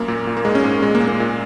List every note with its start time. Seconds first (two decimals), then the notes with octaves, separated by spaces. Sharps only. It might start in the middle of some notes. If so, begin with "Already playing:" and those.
Already playing: F#2 A#3
0.08 A#2
0.27 A#2
0.37 A#3
0.45 G#2 G#3
0.55 C#4
0.64 G#2 A#3
0.82 A#2 G#3
0.95 A#3
1.00 A#2
1.08 A#3
1.20 A#2